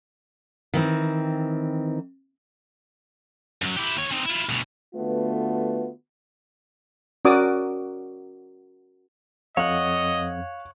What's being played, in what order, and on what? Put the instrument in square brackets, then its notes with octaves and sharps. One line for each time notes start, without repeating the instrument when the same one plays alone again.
[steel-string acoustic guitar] D#3 E3 C4
[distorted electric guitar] F#2 F#3
E4 G4
D#2 C#5
C4 D#4
E4 F4
D2 B2
[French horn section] D3 A3 B3 F4 F#4 B4
[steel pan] C#4 F#4 A#4 D5 D6 D#6
[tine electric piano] F2 [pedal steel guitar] C#5 F#5 [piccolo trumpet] D#5 [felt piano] F5